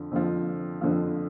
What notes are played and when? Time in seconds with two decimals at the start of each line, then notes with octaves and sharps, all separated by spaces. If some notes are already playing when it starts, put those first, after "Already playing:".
Already playing: F2 D3 F3
0.11 F2 D3 F3
0.81 F2 D3 F3